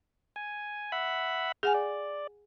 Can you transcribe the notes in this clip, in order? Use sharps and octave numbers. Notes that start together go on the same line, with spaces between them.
G#5
E5 F#5 B5
G#4 F#5 G#5 F6
D5